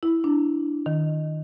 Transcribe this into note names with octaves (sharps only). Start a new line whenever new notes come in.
E4
D4
D#3